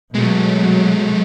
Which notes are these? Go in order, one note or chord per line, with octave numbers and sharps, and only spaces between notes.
B2 F#3 G#3 A3